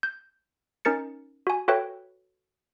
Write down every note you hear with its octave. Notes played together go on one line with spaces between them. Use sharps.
G6
C#4 D#4 A#4 A6 C#7
F#4 G#5
F#4 A4 B4 C#5 E5 G5